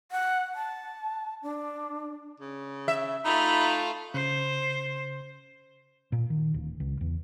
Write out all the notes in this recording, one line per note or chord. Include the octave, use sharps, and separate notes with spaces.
F#5
A5
D4
C#3
E5
A3 D#4 F4 B5
C#3 C5
A#2
D#3
D1
C#2
E2